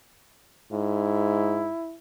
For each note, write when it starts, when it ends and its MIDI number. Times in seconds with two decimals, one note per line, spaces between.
0.72 1.69 44
0.72 1.96 64